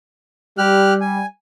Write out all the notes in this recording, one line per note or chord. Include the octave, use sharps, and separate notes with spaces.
G3 G4 F6 F#6
G#5